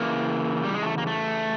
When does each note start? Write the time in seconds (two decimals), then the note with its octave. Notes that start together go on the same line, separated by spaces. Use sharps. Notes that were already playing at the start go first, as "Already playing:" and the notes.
Already playing: C#3 E3 A#3
0.64 G3
0.74 G#3
0.83 A3
0.98 A#3
1.07 A3